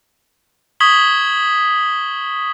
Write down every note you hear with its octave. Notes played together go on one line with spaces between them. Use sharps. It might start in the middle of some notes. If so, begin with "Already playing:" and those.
C#6 D#6 G#6 B6 F#7 G7